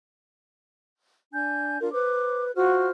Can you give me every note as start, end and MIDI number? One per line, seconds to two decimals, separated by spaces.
1.33 1.79 62
1.33 1.79 80
1.33 1.79 91
1.81 1.91 62
1.81 1.91 65
1.81 1.91 70
1.93 2.51 71
1.93 2.45 72
1.93 2.45 86
2.56 2.90 65
2.56 2.89 66
2.56 2.90 72
2.56 2.90 89